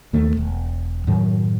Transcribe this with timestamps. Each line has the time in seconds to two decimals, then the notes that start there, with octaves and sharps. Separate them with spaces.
0.13 D#2 D#3 A3
0.37 E1
1.07 F#2 A2 D#3 F#3